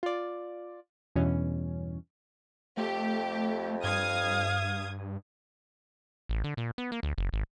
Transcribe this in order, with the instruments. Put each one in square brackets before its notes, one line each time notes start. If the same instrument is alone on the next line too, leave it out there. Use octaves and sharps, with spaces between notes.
[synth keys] F4 D5
E2 G2 B2 E3 C#4
[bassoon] F2 [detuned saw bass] A3 [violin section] G4
[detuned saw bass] G2 [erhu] F5 [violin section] D#6 G#6
[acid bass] A1
D3
A#2
B3
A#3
D2
F#1
G#1